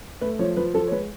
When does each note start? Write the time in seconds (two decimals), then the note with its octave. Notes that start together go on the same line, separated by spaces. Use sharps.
0.21 A3 B4
0.39 F3 C#5
0.57 F3 B4
0.74 F3 A4
0.88 C#5
0.92 G#3 B4